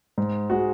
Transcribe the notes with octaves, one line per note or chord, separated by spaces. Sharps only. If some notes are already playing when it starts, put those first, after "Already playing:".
G#2
G#3 F#4